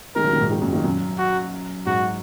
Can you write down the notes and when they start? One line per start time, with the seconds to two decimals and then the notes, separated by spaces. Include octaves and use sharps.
0.15 D#3 G#3 A#4
0.24 C#3 F#3
0.33 A#2 D#3
0.41 G#2
0.50 A#2 D#3
0.61 F#2 A#2
0.73 A#2 D#3
0.84 F#2
1.18 F#4
1.86 G#2 F#4